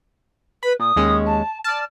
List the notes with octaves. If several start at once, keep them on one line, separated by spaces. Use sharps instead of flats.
B4 B5
A#2 D#6
D#2 G#3 C#4
A5
D5 A5 F6